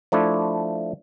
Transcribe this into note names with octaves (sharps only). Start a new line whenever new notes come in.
F3 A3 D4 E4